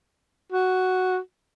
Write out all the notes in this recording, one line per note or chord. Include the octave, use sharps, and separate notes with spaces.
F#4